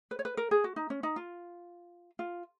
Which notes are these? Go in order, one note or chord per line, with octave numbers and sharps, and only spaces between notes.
B4
C#5
B4
A#4
G#4
F#4
D#4
C#4
D#4
F4
F4